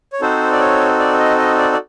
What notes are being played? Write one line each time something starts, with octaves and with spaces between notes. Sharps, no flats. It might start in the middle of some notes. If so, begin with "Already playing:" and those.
C#5
C4 D#4 F#4 A4 C5
D5
C#5
D5
D#5
D#5
D5
D5